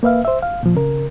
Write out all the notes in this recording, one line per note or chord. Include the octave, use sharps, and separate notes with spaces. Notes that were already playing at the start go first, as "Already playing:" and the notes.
A#3 B4 E5 F5
C5 E5
F5
A#2 F3
C#3 A#4